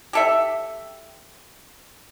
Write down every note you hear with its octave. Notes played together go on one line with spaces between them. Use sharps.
G4 A4 E5